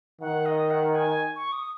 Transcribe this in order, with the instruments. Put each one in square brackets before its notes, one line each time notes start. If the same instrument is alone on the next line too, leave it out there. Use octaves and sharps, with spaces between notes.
[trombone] D#3 [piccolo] F#5
[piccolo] D#5
F#5
G#5
C#6
D#6